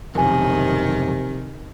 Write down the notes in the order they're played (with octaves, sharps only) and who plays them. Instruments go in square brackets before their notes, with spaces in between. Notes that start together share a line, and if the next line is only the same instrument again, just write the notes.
[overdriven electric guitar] B1 F2 [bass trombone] C3 [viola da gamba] D#3 [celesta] A#4 G#5